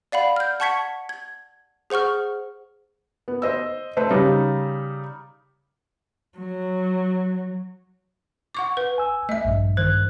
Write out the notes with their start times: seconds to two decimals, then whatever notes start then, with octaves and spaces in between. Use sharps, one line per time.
0.12 D5 F5 F#5 B5
0.36 F6 G6
0.60 F#5 A5 C#6 G#6 B6 C#7
1.09 G#6
1.90 G#4 C5 F#5 C#6 F6
3.28 B3
3.42 C5 D#5 E6
3.97 A3 B4 C5
4.11 C#3 G3 D#4
6.38 F#3
8.55 F#5 C#6 D6
8.77 B4
8.98 G#5 E6
9.29 A3 D#5 E5
9.45 A#1 G2
9.77 G2 D#3 C5 F#6